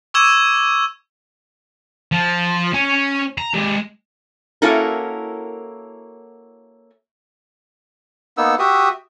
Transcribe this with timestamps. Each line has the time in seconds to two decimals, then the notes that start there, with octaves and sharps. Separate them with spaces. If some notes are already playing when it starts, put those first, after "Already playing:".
0.14 C#6 D6 E6 G#6 E7
2.12 F3
2.74 C#4 G#5
3.38 A#5
3.55 G#3 G4
4.62 A#3 C#4 E4 F#4 A4 A#4
8.37 A#3 B3 D#4 E6
8.59 F#4 G4 E5 D#6